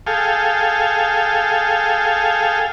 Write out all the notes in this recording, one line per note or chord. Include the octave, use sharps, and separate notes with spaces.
G#4 A4 F5 G5